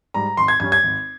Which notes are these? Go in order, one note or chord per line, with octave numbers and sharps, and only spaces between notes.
G#2 G3 A#5
G#1 C6
G#6
G2 G3 C#4 G#6
G#6
G#1